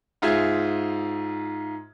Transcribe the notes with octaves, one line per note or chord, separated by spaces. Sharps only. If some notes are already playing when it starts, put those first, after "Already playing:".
G#2 F4 G#4 E5 G#6